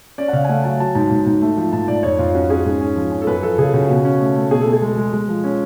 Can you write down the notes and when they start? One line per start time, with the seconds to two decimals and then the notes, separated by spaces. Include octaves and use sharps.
0.18 C#4 D5
0.28 F#5
0.33 C#3 F5
0.44 G#5
0.48 A3 F#5
0.64 F#3 A5
0.80 F#3 A5
0.95 G#2 A5
1.11 G#2
1.26 G#2
1.41 A3
1.57 F3
1.73 G#2 A5
1.88 G#2 D5
2.03 F2 C#5
2.19 F2 F4
2.34 C#4 F#4
2.50 C#4 G#4
2.65 G#2
2.81 C#4
2.96 F3
3.12 C#4
3.22 A4
3.27 F#2 B4
3.42 F3 A4
3.58 C#3 G#4
3.73 C#3 F#4
3.89 B2 F#4
4.04 C#4
4.21 A3
4.35 A3
4.51 B2 G#4
4.61 A4
4.66 B2
4.73 G#4
4.82 G#3
4.98 G#3
5.13 G#3
5.28 F3
5.44 C#4